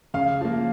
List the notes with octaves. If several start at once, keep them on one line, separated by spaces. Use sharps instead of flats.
C#3 F5
F3 A#3